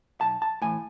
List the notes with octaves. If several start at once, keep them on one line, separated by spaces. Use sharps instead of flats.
B1 A5
A5
A2 E3 G#5